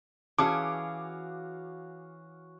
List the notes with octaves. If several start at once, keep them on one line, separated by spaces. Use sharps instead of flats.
E3 C#4 F#4 G#4 F5 A5 D6